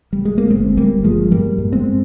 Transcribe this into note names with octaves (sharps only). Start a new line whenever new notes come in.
G3
G#3
A#3
G1 G#3 C4
G1 G3 A#3
G2 F3 G#3
G2 G3 A#3
G2
G#3 C4